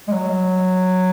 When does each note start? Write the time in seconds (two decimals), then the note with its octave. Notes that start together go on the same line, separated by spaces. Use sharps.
0.08 G#3
0.13 F#3